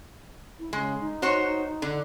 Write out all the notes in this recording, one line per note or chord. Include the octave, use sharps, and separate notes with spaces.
E4
C#3 G#3
D#4
F#4 C5 C#5
D3